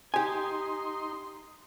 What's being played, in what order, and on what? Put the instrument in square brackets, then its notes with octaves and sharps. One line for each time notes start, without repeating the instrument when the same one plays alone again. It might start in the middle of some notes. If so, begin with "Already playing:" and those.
[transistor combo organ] D#4 C6 [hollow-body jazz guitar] G4 G#5